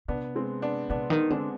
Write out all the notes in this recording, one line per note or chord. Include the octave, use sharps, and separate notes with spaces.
C3 B3 D4
G#3 C4
B3 D4
C3 B3 D4
D#3
D3 G#3 C4